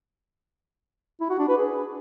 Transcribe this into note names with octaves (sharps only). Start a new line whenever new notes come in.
E4
F#4
D4
B4
G#4